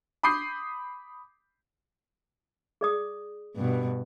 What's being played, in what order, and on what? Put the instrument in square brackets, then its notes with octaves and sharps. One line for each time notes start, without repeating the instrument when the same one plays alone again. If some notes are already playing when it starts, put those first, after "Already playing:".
[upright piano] B5 D6 D#6 G6 C7
[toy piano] G#4 D5 D#6
[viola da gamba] G2 B2